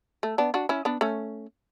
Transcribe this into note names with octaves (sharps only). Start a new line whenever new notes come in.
A3
B3 D4
D4 F#4
C#4 E4
B3 D4
A3 C#4